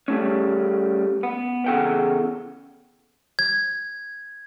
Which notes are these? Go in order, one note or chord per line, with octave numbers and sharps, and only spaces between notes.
G3 A3 C#4
B3
E2 C#3 D4 A4 F#5 G5
G#6